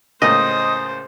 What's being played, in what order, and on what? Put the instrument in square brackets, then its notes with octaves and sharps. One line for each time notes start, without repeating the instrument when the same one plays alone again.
[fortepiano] C#2 A2 A#3 [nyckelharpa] C5 [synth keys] D#5 [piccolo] D#6